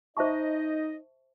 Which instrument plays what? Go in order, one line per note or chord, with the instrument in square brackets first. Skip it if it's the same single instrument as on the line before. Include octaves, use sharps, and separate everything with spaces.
[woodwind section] D#4 D#5 [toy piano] C5 E5 A5 C#6